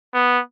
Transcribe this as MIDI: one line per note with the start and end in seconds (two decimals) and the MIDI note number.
0.14 0.40 59